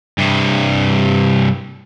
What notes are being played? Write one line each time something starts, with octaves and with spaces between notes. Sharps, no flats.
G2 C3